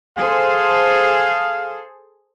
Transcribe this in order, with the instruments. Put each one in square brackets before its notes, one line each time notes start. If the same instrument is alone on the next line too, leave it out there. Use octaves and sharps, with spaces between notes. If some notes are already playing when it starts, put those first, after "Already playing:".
[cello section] G#4 A4 C5 [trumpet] F5